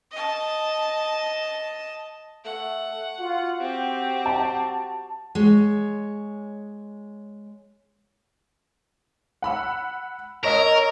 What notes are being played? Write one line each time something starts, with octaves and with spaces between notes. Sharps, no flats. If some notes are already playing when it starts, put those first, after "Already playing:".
D#5 A5
A3 F#5
F4 F#4
C4 G4
A5
G#3 C#5
F#5 B5 E6
A#4 C#5 D#5 E6